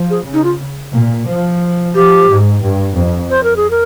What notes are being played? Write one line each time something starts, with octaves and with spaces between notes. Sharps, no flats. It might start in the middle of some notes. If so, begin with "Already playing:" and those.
Already playing: F3
G#4
C#3
D#4
F4
A#2
F3
F3 G4
G#2
G2
F2
C5
A#4
G#4
A#4